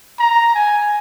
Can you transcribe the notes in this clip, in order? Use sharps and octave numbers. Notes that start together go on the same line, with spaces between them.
A#5
G#5